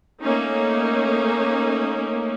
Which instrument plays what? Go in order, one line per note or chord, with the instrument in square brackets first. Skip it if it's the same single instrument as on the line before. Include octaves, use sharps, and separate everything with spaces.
[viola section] A3 A#3 C#4 D#4